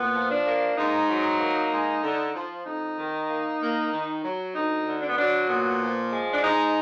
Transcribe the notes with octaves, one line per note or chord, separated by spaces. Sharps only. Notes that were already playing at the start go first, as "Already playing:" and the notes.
Already playing: A#2 B3
F3
D4
A#3
G#2 D#4
F#3
A#3
G#3
D3
F3
F2 D#4
D#3
A#3
A#3
D#3
F#3
D2 D#4
D3
D4
B3
F#3 D4
A#2 B3
F3
G#3
D4
G#2 D#4